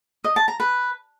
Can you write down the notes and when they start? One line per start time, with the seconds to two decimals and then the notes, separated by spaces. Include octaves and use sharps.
0.24 D#5
0.36 A5
0.48 A#5
0.60 B4